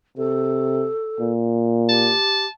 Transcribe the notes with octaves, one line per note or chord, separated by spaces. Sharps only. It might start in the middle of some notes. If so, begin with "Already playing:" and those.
C3 A4
A#2
G4 A5